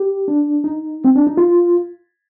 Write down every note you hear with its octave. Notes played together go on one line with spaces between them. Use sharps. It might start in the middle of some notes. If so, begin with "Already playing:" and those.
Already playing: G4
D4
D#4
C4
D4
D#4
F4